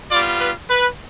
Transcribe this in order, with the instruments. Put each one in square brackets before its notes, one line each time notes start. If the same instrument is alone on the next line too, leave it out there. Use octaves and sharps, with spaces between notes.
[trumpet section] G3 B3 F4 D5
B4
B4